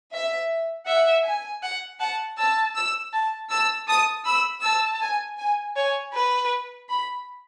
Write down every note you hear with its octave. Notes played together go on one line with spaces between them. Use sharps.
E5
E5 F#5
G#5
F#5
F#5 A5
A5 E6
E6
A5
A5 E6
A5 D#6
B5 E6
A5 E6
G#5
G#5
C#5 G#5
B4 B5
B5